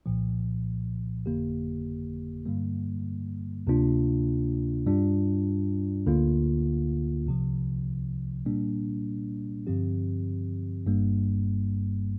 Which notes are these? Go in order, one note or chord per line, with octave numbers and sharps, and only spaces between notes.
C2 A#2 F3
G1 F2 D3 A#3 G4
G2 D3 G3 A#3
D2 C3 A#3 D4 F4
G2 G3 D4 F4
D2 D3 A#3 F4
C2 C3 F3
A#2 G3 A#3 D4
G2 D3 F3 C4 G4
G1 G2 G3 A#3